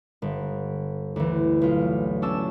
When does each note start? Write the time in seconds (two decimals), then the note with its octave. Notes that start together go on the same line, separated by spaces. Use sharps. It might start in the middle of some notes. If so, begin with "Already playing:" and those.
0.22 G1
1.16 D2 E3
1.62 B1 F4
2.22 C#4 D4 A5 E6